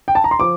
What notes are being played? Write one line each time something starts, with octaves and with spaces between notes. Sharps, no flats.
G5
A5
A#5
C6
F3 D6